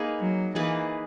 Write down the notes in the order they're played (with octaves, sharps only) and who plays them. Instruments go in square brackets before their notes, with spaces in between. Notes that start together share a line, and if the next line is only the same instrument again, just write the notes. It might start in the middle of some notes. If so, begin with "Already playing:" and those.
Already playing: [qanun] A#3 D#4 G#4 B4
[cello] F#3
[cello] E3 [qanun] A#3 D#4 G#4 B4